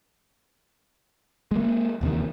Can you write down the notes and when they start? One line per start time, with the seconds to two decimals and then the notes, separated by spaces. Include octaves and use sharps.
1.51 G#3 A#3
2.01 E1 D#2 C3 D#3